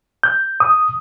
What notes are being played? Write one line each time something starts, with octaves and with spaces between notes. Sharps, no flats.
G6
D#6